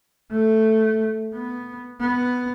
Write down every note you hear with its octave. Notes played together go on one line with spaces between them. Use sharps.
A3
B3
B3